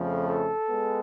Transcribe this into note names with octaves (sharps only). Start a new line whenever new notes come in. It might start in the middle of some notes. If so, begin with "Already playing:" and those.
Already playing: F2 C#3 F3 A3
A4
G#3 B3